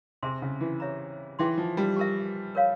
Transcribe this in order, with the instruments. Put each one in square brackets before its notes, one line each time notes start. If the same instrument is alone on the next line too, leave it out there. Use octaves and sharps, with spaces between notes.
[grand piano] C3 [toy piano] G#4 E5 G#5 C6
[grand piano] C#3
E3
[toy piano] G4 C#5 E5 A#5
[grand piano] E3 [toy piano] G#4 E5 G5 C6
[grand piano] F3
G3
[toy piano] G4 A#4 E5
A#4 C#5 F5